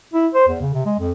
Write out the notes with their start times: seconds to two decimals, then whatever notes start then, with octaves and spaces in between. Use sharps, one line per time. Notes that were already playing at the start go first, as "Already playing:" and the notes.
0.14 E4
0.34 C5
0.48 E2
0.61 C#3
0.74 C3
0.86 G#3
0.99 F2